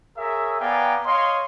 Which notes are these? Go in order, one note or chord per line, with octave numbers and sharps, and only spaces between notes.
G#4 A#4 C#5 E5
B3 D5 F5 G5 G#5 A#5
C#5 D#5 F5 C6